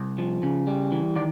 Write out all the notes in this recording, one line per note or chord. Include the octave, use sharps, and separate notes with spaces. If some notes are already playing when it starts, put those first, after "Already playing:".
Already playing: C2
F3
C#3
G3
E3
D#3 D5